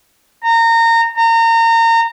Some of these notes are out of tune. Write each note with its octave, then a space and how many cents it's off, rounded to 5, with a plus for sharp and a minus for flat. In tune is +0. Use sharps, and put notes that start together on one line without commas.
A#5 -25
A#5 -30